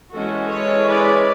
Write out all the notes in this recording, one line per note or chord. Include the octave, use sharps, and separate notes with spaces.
E3 G#3 C#4 F#4 A4
A4 C#5
B4 D5